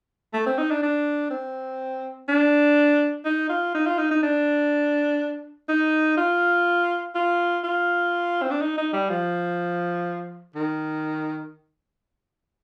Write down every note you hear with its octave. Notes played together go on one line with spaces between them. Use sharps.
A3
C4
D#4
D4
D4
C4
D4
D#4
F4
D#4
F4
D#4
D#4
D4
D#4
F4
F4
F4
C4
D4
D#4
D#4
G3
F3
D#3